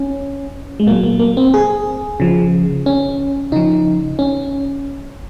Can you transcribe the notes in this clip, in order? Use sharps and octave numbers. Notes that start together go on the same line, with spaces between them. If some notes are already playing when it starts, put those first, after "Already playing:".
Already playing: C#4
G#3
A#2 F#3 A#3
A#3
A#3
C4
G#4
C#3 F3
C#4
C#3 F3 D#4
C#4